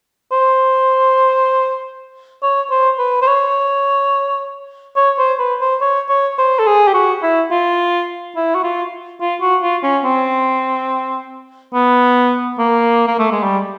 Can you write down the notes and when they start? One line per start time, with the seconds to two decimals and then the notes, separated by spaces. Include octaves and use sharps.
0.32 C5
2.43 C#5
2.71 C5
2.99 B4
3.22 C5
3.27 C#5
4.96 C#5
5.19 C5
5.39 B4
5.61 C5
5.81 C#5
6.09 C#5
6.39 C5
6.59 A4
6.66 G#4
6.88 G4
6.94 F#4
7.23 E4
7.51 F4
8.36 E4
8.55 F#4
8.64 F4
9.21 F4
9.41 F#4
9.63 F4
9.83 C#4
10.04 C4
11.74 B3
12.59 A#3
13.07 A#3
13.19 A3
13.32 G#3
13.43 G3